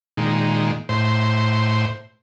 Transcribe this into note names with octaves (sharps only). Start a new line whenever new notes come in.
A#2 D#3 G#3
A2 C5